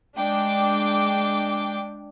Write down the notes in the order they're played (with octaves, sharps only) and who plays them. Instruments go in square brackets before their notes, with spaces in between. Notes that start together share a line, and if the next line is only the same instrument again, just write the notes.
[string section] G#3 D4 G5 D6